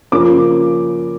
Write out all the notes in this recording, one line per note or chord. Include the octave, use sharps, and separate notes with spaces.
C#3 F3 A#3 D6